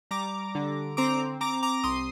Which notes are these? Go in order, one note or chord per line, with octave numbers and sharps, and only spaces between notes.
G3 A#5 D6
D3
C4 A#5 D6
C4 A#5 D6
A#5 D6
C2 C6 D#6